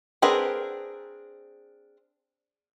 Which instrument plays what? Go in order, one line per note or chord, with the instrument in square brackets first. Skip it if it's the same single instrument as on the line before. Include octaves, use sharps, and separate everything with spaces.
[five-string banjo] C4 D4 G#4 A#4 B4